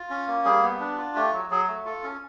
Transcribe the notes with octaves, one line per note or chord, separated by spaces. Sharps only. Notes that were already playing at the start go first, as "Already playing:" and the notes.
Already playing: F4
C#4
A#3
G3 G#4
B3
D4
F4
A3 G4
F#3
F#3 G#4
A3
F4 A4
C#4